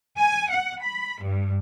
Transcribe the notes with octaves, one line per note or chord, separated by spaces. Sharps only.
G#5
F#5
B5
G2